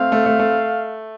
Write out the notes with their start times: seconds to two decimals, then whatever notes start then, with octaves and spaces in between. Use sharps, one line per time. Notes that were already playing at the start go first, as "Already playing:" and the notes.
Already playing: A3 C4 F5
0.12 A3
0.26 A3
0.39 A3